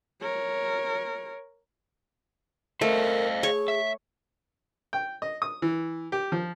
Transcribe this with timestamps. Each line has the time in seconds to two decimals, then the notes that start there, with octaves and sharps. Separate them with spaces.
0.21 A#4 C#5
2.81 A3 A#4 C5 D#5 F5
3.43 G#4 C#5 C#6
3.68 E5
4.93 G5
5.22 D#5
5.42 D#6
5.62 E3
6.12 G4
6.32 F3